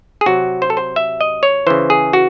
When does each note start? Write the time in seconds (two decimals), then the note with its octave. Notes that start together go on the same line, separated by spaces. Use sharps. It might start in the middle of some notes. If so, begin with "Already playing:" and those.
0.21 G#4
0.26 C3 F#3 F#4
0.62 C5
0.70 A4
0.77 C5
0.96 E5
1.21 D#5
1.43 C#5
1.67 C#3 E3 C5
1.90 G#4
2.13 F#4